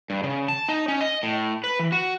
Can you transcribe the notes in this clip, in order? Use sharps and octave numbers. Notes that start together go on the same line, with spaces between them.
G2
C#3
A5
D#4
C#4
D#5
A2
B4
E3
F#4